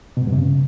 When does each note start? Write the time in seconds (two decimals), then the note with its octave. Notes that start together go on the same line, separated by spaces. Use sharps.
0.17 B2
0.22 G#2
0.27 G2
0.32 C3
0.38 C#3